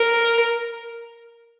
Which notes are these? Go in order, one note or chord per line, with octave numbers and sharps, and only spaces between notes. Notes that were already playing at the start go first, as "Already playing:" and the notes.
Already playing: A#4